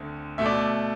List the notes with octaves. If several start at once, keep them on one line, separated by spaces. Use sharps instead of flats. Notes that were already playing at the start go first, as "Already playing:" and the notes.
Already playing: D2 D3 A3 C4
B2 A3 E5
D5